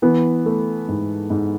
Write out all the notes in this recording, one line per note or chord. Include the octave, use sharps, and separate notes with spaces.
E3 B3
A3
G#2
G#2